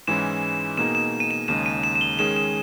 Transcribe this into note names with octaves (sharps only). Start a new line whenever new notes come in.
G#2 E3 G#3 C#4 E4 E7
B2 A#3 D#4 G#4 E7
E7
D#7
E7
D#2 C#3 G#3 D#4 E7
D#7
E7
E7
G7
D#3 G#3 C#4 G#4 E7
E7